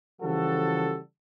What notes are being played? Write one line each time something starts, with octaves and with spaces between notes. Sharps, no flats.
C#3 E3 F3 G3 F#4 A4